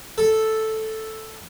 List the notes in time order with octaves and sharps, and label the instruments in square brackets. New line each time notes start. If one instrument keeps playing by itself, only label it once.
[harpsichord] A4